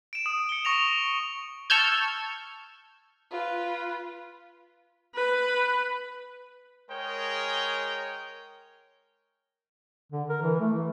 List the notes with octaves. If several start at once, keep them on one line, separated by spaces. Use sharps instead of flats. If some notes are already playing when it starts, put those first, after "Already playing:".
D7 E7
D#6
C#7 G7
C#6 A#6 F7
A5 C#6 E6 F6 G6 G#6
F4 B4
B4
G#3 G#4 A#4 C#5 G5
D3
A#4
E3
A3
E3